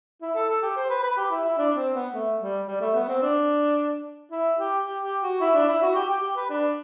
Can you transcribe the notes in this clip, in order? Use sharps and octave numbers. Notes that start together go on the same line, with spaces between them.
E4
A4
A4
G4
C5
B4
B4
G4
E4
E4
D4
C4
B3
A3
G3
G3
A3
B3
C4
D4
E4
G4
G4
G4
F#4
E4
D4
E4
F#4
G4
G4
G4
B4
D4